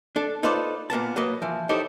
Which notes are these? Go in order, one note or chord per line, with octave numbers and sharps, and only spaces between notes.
D4 A4
D#4 F4 A4 B4 C5 D5
A#2 A#3 B3 A5
F#3 A#3 B4 D#5
E3 F3
D#4 E4 G4 A4 C5 C#5